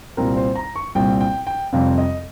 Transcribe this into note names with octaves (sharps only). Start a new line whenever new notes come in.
C2 A#2 G3 C4 A#4
C5
A#5
C#6
C2 A#2 G3 C4 G5
G5
G5
F2 C3 G3 C4 F5
D#5